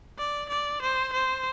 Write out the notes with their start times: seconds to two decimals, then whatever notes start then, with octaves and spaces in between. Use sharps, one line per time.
0.18 D5
0.50 D5
0.82 C5
1.13 C5